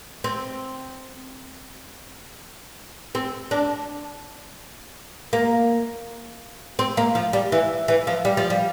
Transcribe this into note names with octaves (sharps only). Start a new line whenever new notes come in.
C4
C4
D4
A#3
C4
A#3
F3
G3
E3
E3
F3
G3
F3
G3